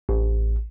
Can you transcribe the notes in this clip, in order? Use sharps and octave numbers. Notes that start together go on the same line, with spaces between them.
A1